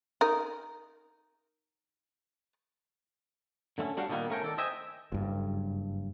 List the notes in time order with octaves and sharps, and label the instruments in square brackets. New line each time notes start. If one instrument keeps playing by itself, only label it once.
[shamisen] D#4 A#4
[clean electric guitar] D3 A3 C4 C#4
G3 D4 F#4 G4 F5
A#2 D3 D#3 G3 A#3 B3
A3 C#4 A#4 C#5 G5
D#3 A4 D5
C5 D#5 E5 G5 G#5
[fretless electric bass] F#1 G2